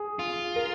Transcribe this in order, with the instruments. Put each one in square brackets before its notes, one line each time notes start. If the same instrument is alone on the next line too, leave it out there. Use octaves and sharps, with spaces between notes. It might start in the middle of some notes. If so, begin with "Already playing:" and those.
Already playing: [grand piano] G#4
[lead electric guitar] F4
[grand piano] A#4